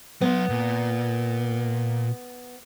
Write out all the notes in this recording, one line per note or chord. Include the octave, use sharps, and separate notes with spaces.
F#3 B3 C6
A#2